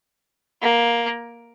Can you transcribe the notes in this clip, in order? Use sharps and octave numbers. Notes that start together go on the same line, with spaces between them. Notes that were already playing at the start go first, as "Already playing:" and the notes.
A#3